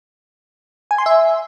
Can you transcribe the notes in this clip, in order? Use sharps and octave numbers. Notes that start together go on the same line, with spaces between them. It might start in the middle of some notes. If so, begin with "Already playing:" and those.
G#5
C6
E5